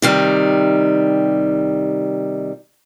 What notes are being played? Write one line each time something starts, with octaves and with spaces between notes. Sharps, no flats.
C3 D#3 G3